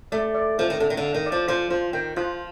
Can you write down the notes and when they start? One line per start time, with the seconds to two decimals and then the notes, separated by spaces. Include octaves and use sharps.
0.12 A3 D5
0.35 D5
0.58 F3 A4
0.70 D#3
0.80 D3 A4
0.90 D#3
0.97 D3
1.03 F5
1.14 D#3
1.26 D5
1.32 F3
1.48 F3 C5
1.70 F3 F4
1.93 D#3 G5
2.16 F3 F4